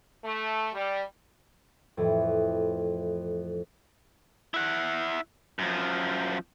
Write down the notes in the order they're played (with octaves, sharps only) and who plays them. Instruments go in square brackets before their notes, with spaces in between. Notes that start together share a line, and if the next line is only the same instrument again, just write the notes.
[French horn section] A3
G3
[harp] F2 A2 E3
[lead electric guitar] E4 F#5
F#2 F3